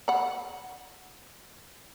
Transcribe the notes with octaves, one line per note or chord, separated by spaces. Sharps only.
F#5 B5